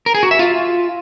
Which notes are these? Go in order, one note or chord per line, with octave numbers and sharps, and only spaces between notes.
A#4
G#4
F#4
E5
F4